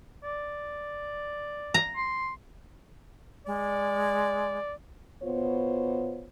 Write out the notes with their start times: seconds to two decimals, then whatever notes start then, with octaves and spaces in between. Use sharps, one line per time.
0.24 D5
1.74 A#5
1.96 C6
3.47 G#3 D5
5.23 B2 B3 F4 C5 C#5